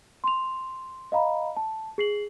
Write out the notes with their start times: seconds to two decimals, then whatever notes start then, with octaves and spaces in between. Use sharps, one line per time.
0.24 C6 F7
1.12 D#5 F5 A#5 B5
1.57 A5
1.98 G#4 C7 F#7